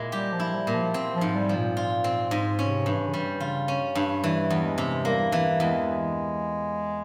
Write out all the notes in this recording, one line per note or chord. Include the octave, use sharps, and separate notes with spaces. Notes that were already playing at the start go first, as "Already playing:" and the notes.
Already playing: A#2 G#3 E4
G3 G4
F3
E4
G3
A#2
F3
C4
F3
G#2
G3
F3
A#2
F4
C4
G#2
C3 C#4
G2 E3
C#3
E3 G3
C#3 F4
C#4
G2
E3 G3
E2
G#3
C3
G3 A#3
E3
E2 G#3